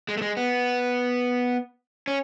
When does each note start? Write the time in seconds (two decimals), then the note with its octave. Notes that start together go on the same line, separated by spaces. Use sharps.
0.09 G#3
0.17 A3
0.22 G#3
0.37 B3
2.08 C#4